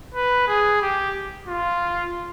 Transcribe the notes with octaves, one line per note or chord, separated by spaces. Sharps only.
B4
G#4
G4
F4